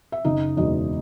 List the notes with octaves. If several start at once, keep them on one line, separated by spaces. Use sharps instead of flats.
E5
F#1 D#4 D#5
E2 B2 G#3 D#4 D#5